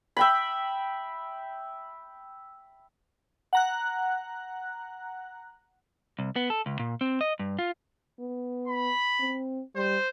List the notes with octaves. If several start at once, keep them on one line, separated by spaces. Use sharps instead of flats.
E5 G5 B5
F#5 A#5 F#6
C2
B3
A4
C#2
A#2
C4
D#5
G2
F4
B3
B5
C4
G3 C5